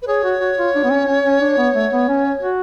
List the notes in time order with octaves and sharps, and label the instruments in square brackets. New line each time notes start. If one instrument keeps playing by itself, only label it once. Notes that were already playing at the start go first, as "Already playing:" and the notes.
[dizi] B4
[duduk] G#4 [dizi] C#5
[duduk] F#4
F#4
F4
D4
B3
C#4
C#4
C#4
D4
B3
A3
B3
C#4
F#4